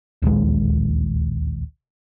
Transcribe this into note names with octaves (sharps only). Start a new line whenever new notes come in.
D1 A#1 D#2 G#3